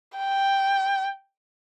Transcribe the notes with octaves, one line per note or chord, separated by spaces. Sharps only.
G5